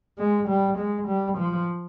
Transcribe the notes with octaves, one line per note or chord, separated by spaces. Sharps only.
G#3
G3
G#3
G3
F3